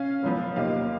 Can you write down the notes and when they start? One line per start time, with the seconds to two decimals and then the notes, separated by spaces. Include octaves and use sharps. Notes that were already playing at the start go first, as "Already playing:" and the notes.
Already playing: C#4 F5
0.23 F#1 F#2 F3 B3
0.56 D#2 D#3 A#3 D#4 F5